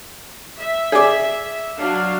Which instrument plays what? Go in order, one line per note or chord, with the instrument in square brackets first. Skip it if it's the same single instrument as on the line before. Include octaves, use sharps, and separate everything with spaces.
[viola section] E5
[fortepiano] G#4 D5
[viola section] F#3 D4 F5